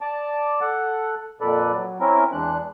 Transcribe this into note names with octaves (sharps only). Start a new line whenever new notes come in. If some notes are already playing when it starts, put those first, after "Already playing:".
D5 A5 D6
A4 F#5
F2 A#2 A4 B4 D5
F#3
C4 C#4 E4 A#4
E2 E3 G#3 D4 F#6